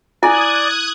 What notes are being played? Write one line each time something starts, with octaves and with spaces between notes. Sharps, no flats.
E4 D5 G#5 D#6 F#6 G#6